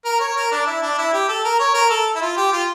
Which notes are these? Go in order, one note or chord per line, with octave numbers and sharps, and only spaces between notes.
A#4
C#5
A#4
D4
E4
D4
E4
G4
A4
A#4
C#5
A#4
A4
E4
F4
G4
F4